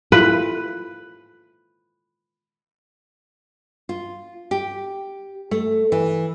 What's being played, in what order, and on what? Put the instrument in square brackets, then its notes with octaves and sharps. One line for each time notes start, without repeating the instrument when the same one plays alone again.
[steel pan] E4 F4 A4 [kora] B4
[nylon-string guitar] F4
G4
A3
E3